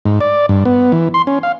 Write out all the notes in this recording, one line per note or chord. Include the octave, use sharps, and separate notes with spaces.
G#2
D5
G2
B3
E3
C6
C#4
F5